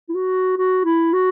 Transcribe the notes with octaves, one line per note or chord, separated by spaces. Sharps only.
E4
F#4
F#4
E4
F#4